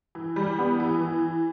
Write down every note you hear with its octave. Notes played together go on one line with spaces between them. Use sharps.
E3
G3
B3
E3
E3